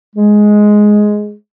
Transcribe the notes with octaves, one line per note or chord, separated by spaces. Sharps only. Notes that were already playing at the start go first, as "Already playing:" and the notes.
G#3